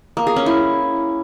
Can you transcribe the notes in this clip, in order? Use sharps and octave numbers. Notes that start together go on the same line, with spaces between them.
A#3
G#4
C#4
E4